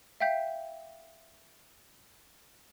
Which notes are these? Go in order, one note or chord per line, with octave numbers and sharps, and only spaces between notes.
E5 F5 G5 G6 B6